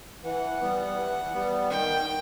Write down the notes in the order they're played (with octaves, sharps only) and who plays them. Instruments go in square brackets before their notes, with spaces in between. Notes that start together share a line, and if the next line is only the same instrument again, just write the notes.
[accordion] E3 [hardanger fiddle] F#5
[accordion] G3 B3
E3
G3 B3
[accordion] D#3 [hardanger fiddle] G5